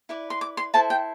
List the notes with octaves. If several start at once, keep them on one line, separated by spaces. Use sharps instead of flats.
E4 B4 D5
C6
D6
C6
E4 A4 C5 A5
G5